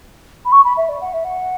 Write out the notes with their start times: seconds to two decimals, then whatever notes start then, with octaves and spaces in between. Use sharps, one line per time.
0.45 B5
0.52 C#6
0.64 B5
0.77 E5
0.88 D5
1.01 F#5
1.13 E5
1.24 F#5